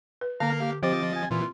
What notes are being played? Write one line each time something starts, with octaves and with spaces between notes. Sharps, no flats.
B4
D3 A#3 F5 A#5
G4
F3 C4 G4 C5 D#5 D6 A6
G#5
A#2 E3 F4